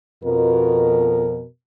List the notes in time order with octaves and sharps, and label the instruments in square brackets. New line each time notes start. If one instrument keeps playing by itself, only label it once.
[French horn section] F2 B2 A#4